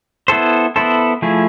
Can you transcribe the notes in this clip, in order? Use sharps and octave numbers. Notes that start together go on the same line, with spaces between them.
B3 E4 A4 C5
B3 E4 A4 C5
F3 A3 E4 G#4